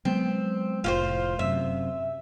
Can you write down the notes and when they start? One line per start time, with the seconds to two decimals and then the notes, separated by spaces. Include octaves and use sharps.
0.05 F#3 G#3 B3 C4
0.84 F1 A2 F4 F#4 C5
1.39 F#2 C3 E5